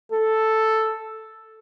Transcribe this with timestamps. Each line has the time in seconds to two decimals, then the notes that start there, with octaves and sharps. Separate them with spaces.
0.12 A4